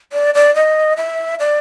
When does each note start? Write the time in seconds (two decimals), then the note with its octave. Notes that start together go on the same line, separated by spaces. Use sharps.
0.13 D5
0.35 D5
0.55 D#5
0.97 E5
1.40 D5